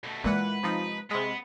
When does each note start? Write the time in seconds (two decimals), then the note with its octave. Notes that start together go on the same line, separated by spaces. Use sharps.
0.04 B2 A3
0.24 A#2 E3 G#3 B4 F#5
0.63 C3 F3 D#4
1.11 C3 G#3 B3